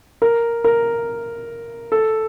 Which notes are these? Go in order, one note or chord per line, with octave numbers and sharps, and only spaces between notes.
A#4
A#4
A4